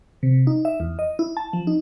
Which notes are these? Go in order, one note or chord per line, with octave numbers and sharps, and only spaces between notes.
C3
D#4
E5
E2
D#5
E4
A5
F3
D#4